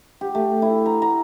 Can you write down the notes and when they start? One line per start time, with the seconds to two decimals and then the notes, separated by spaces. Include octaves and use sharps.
0.21 G4
0.35 A3
0.62 E4
0.86 A#5
1.02 A#5